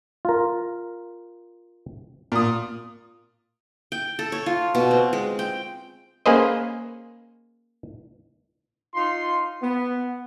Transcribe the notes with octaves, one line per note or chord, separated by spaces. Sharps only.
F4 A#4
A#2 D#6
G5
A4
C#5
F4
B2
C4
G#3
G5
A#3 C#4 G#4 B4 C5 D#5
D#4 F4 C6
B3